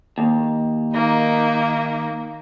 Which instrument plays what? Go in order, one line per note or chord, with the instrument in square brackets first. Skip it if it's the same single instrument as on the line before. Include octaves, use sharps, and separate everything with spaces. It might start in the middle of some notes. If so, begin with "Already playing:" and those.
[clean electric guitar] D#2
[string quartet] D#3 A#3 D#4